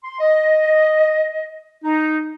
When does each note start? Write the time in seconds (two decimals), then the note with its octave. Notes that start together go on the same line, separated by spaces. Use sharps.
0.04 C6
0.21 D#5
1.84 D#4